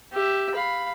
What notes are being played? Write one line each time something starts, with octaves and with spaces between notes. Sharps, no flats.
G4 E5
F5 B5